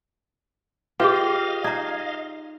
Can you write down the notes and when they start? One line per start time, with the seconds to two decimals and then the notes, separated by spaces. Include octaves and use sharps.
1.00 F4 G4 G#4 B4 D#5 F5
1.64 D#4 D5 E5 A#5